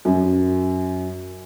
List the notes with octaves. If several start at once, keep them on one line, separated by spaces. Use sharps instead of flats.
F#2